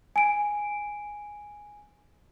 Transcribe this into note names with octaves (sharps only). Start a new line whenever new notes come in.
G#5 D7